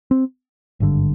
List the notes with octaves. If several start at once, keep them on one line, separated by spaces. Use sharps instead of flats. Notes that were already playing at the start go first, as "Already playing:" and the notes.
C4
G#1 G2 D3